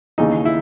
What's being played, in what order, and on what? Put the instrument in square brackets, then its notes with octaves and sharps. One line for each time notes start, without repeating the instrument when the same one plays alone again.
[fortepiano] D#2 C#3 E3 D#4
E4